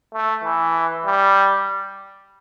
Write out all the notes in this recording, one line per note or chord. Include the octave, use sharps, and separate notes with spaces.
A3
E3
G3